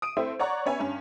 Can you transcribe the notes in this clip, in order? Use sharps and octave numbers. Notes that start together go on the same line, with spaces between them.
D#6 D7 D#7
A3 C4 E4 C5 E5
C#5 D5 F#5 A#5 C#6
B3 C#4 C#5 E5 G#5
G2 C#4